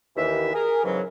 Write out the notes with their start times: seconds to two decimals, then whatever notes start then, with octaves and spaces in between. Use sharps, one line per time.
0.16 D#2 D#3 E3 E5
0.53 G#4 A#4
0.83 G#2 C#3 E3 F#3